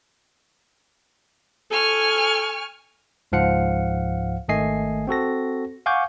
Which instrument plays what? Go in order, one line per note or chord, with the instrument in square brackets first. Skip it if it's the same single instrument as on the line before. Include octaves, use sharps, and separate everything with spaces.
[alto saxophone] A4 [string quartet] G#5 C#6 F6
[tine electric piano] C#2 G#2 F3 F5 F#5 C#7
G#1 D#3 A3 D#5 G#5 C7
C4 F#4 A4 A#6
F5 F#5 G#5 C#6 D6 G6